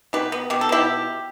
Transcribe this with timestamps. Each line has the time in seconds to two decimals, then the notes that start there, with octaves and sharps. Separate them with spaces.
0.13 B2 G4 B4
0.32 B3
0.50 B2 G4
0.61 A4
0.69 B2 E4 G4